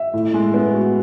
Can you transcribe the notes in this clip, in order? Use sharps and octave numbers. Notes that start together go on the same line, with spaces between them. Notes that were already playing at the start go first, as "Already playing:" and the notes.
Already playing: E5
A2
G#3
B3
F#4